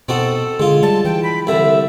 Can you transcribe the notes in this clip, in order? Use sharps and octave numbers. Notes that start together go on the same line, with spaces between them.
B2 C4 D#4 F#4 A4
D3 G#3 F4
G3 A5
E3 G5
B5
C2 D3 E5